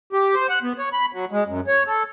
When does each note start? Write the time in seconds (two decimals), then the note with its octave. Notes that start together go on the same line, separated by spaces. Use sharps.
0.13 G4
0.35 C5
0.49 F#5
0.62 B3
0.79 C#5
0.93 B5
1.13 F#3
1.31 G#3
1.47 F#2
1.67 C#5
1.87 A4